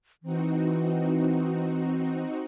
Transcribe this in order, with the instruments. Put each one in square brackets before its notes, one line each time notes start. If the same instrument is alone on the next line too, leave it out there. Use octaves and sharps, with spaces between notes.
[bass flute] E3 [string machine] C4 D#4 F#4